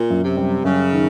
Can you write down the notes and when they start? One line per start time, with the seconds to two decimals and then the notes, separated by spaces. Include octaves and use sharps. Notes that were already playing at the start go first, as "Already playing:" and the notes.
Already playing: A#2
0.10 F#2
0.24 C3
0.37 G3
0.64 F#2 C#3
0.92 D#3